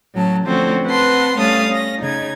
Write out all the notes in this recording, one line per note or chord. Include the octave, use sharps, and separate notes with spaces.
A2 F#3 C#4 A5
D3 F3 A3 C4 C#4 F#4
C4 B4 F#5 A5 C6
G3 A3 C#4 F5 D#6 A6
C#4 A#6
C#3 D#4 G#6